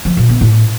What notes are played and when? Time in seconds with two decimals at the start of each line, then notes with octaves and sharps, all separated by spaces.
0.05 F3
0.17 A#2
0.29 B3
0.41 A2